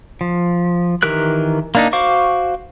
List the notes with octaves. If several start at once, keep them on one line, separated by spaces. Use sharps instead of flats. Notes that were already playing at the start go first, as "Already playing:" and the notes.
F3
D#3 E3 G4 A#4 F#6
A#3 D4 D#4
F#4 C5 F5 C#6 D6